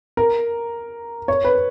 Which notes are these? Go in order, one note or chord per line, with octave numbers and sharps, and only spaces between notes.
A#4
C#5
B4